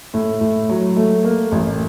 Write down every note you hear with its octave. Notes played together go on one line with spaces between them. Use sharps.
A2
A2
F#3
A3
A#3
A1